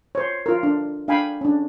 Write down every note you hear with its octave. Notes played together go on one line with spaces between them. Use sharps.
C5 C#5
F4 A#4
D4
D4 F5 G5 G#5 B5
C#4 D4